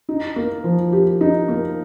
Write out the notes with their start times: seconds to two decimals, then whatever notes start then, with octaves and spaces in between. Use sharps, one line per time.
0.09 D#4
0.36 A#3
0.64 F3
0.92 G4
1.21 D#4
1.48 A#3